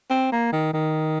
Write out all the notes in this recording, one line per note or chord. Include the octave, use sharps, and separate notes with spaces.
C4
A#3
D#3
D#3